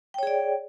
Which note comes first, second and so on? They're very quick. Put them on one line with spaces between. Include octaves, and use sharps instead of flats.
G5 C#5 G#4 D5